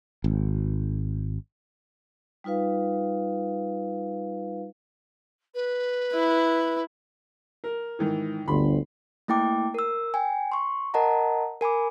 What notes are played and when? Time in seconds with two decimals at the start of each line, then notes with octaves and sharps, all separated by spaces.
0.24 G#1
2.44 G3 D#4 F4 B4 F5
5.54 B4
6.13 E4
7.64 A#4
7.99 G#2 D#3 E3
8.48 G1 D2 B5 C6
9.28 A3 A#3 E4 G5 D6
9.74 A#4 E6
10.14 G5 G#5
10.52 C6 C#6
10.94 A#4 D#5 F#5 A5 A#5
11.61 A#4 G#5 B5 D6